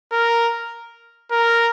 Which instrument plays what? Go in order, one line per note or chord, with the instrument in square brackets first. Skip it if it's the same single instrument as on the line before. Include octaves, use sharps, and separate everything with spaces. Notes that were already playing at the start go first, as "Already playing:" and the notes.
[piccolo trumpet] A#4
A#4